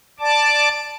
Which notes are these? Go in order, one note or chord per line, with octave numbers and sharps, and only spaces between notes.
D5 A5 D6